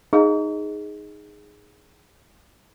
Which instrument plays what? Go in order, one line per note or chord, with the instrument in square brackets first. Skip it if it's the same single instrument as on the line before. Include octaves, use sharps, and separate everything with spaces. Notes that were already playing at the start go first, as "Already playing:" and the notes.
[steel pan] D#4 [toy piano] G#4